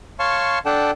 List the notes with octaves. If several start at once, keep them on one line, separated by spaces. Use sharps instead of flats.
C#5 F5 A5 C6 C#6
D4 A4 D5 F#5 G5 A5